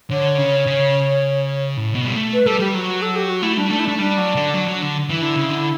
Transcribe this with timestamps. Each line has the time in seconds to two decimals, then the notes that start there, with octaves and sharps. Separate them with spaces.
0.11 D3 C#5
0.38 C#3
0.66 C#3
1.77 A2
1.95 B2
2.05 G3
2.14 A3
2.33 B4
2.46 G3 A4
2.59 G3 G4
2.74 F#3 F#4
3.02 A4
3.15 G4
3.29 F#4
3.42 A3 E4
3.56 G3 D4
3.70 A3 D4
3.79 E4
3.85 A3 D4
3.98 G3 D4
4.17 F#3
4.36 D3
4.54 F#3
4.68 F#3
4.82 D3
5.10 E3 E4
5.22 D3
5.36 C#3
5.50 D3